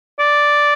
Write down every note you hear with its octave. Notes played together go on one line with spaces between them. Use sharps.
D5